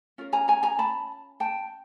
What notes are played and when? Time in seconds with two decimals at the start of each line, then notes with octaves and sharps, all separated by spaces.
0.18 C#4 F4 A#4
0.33 G#5 A#5
0.48 G#5 A#5
0.63 G#5 A#5
0.79 A5 B5
1.40 G5 A5